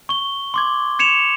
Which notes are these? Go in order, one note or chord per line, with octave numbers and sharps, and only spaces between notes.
C#6 G7
C6 D6 G#6
G#6 C#7 E7 F7